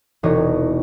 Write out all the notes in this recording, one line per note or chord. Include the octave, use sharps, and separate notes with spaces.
E1 C3 D#4 C#5 D#5